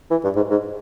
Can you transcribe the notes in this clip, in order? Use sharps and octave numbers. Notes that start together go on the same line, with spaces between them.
E3
G2
G#2
G#2